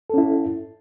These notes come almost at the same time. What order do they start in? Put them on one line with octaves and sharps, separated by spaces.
A4 C#4 E4